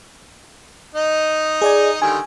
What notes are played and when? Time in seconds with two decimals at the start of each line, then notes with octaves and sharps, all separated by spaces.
0.95 D#4 D#5
1.62 G#4 D5 G#5
2.02 D3 D#3 G3 G#5